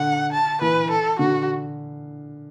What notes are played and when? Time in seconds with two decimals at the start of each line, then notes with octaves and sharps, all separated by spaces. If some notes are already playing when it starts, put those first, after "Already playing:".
Already playing: D3 F#5
0.32 A5
0.61 E3 B4
0.90 A4
1.19 D3 F#4